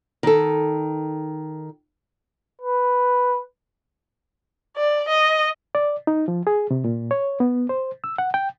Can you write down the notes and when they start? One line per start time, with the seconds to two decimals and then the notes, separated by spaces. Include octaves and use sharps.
0.23 D#3 A4
2.61 B4
4.77 D5
5.08 D#5
5.75 D5
6.07 D#4
6.28 F3
6.47 G#4
6.71 C3
6.84 A#2
7.11 C#5
7.40 B3
7.69 C5
8.04 E6
8.18 F#5
8.34 G5